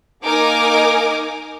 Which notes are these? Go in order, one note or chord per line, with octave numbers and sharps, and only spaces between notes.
A#3 D#4 A#4 G#5 D6